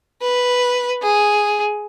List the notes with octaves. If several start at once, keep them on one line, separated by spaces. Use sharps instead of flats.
B4
G#4